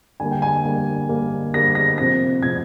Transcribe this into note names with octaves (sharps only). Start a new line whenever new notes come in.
D3 G3 A#3 G#5
G5
G#5
D3 G3 A#3
D3 G3 A#3
D3 G3 A#3 A#6
A#6
C3 F3 C4 A#6
C3 F3 C4 G#6